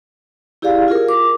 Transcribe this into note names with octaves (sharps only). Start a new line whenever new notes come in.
E4 G4 G#4 D5 F5
F4 G#4 A#4
D6